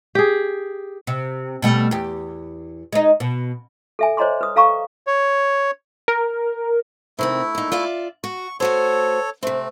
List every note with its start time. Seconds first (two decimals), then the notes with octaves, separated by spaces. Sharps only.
0.15 G4 G#4
1.07 C3
1.62 B2 G3 A3
1.91 E2 G4
2.93 G#3 D#4
3.20 B2
3.99 A4 E5 G#5
4.17 C5 C#5 D#5 A#5 C6 D6
4.41 B4 D#6
4.56 A4 F5 A#5 C#6
5.07 C#5
6.08 A#4
7.19 C3 D#3 A3 C4 E4
7.55 A#2 D#4
7.72 F4 D5 E5
8.24 F#4 C#6
8.60 A3 F#4 A4 C5 C#5
9.43 C3 A3 C4